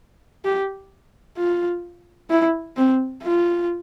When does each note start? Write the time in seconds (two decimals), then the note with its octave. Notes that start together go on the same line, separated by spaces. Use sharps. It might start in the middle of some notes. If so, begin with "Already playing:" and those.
0.45 G4
1.37 F4
2.30 E4
2.77 C4
3.23 F4